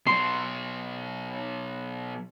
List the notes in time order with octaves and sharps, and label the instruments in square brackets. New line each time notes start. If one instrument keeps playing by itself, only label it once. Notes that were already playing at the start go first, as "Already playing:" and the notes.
[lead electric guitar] B2 F#3 [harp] C6